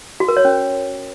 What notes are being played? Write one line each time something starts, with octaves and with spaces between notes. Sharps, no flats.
F#4
A#4
C#5
C#4